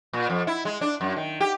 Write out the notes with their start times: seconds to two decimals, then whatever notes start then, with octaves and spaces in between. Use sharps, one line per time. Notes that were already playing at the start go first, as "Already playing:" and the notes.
0.13 A#2
0.30 F2
0.47 E4
0.65 G#3
0.81 D4
1.01 F#2
1.16 D#3
1.41 G4